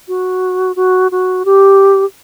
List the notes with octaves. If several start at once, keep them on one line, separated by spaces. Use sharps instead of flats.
F#4
F#4
F#4
G4